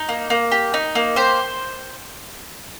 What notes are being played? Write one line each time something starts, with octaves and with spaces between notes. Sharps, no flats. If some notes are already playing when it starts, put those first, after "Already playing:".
Already playing: D#4 A#5
A#3
A#3
G4
D#4
A#3
G4 C5